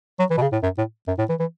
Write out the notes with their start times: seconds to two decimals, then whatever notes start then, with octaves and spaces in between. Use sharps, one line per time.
0.19 F#3
0.31 E3
0.38 B2
0.42 C#3
0.52 A2
0.63 F#2
0.78 A2
1.07 F#2
1.18 A2
1.29 E3
1.40 E3